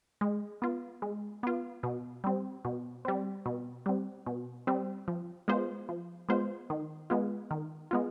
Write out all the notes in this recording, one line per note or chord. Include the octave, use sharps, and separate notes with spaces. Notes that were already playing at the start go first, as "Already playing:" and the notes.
G#3
B3 F4
G#3
B3 F4
B2
G3 C4
B2
G3 C4
B2
G3 C4
B2
G3 C4
F3
G#3 B3 F4 C5
F3
G#3 B3 F4 C5
D#3
G#3 B3 F4
D#3
G#3 B3 F4